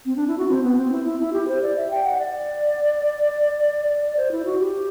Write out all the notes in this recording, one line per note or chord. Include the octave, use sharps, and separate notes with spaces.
C4
D4
E4
F#4
C4
B3
C4
E4
E4
E4
G4
C5
D5
E5
G5
F#5
D5
D5
D5
C5
E4
F#4
G4